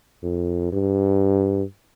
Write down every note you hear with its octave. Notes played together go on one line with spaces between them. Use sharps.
F2
G2